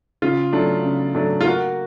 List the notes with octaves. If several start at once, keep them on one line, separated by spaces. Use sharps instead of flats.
C#3 F4
F#3 A3 D4
C#3
F#3 A3 D4
F4
A#3 F#4